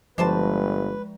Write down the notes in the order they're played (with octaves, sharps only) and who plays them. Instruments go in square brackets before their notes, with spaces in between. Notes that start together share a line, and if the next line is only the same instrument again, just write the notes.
[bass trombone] G1 [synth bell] F3 G#3 [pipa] D4 C5 A5 [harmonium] B4